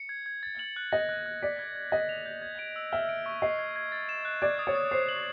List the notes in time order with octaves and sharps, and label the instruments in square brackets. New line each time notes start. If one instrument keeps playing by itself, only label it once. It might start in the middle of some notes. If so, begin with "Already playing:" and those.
Already playing: [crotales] C#7
G#6
G#6
A6
F#7
F#6
[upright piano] D#5 [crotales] A#6
[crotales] F#6
F#6
[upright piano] D5 [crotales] B6
[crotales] G#6
G#6
[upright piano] D#5 [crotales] A#6
[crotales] F7
G6
G#6
D7
E6
[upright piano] E5 [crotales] F6
[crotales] D7
C#6
[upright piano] D#5 [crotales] C7
[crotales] G#6
G#6
A6
E7
F#6
[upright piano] D5 [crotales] G#6
[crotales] D#6
[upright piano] C#5
[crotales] D#6
[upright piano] C5 [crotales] C7
[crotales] F#7